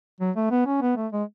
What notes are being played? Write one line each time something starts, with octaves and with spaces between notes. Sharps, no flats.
F#3
A3
B3
C#4
B3
A3
G#3